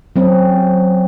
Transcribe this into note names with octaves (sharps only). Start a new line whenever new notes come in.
F#3 C4 C#4